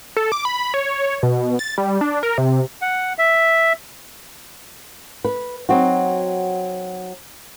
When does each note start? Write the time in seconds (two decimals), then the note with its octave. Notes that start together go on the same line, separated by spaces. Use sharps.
0.17 A4
0.32 D6
0.45 B5
0.74 C#5
1.23 B2
1.59 A6
1.78 G3
2.01 D4
2.23 A#4
2.38 C3
2.82 F#5
3.18 E5
5.25 B4
5.69 F#3 C4 D#4 F#4